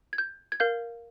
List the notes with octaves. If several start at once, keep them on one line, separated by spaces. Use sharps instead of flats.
G#6
G6
G#6
A#4 F5 G6